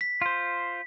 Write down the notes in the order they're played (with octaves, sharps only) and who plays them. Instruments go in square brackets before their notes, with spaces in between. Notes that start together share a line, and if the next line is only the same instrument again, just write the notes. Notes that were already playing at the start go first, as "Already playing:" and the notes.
[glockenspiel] B6
[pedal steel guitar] F4 C5